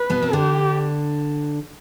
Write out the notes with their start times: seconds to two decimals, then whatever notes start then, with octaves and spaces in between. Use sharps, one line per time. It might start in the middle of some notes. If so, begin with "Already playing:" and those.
Already playing: B4
0.10 B2 B3
0.23 C4
0.33 D3 D4 G4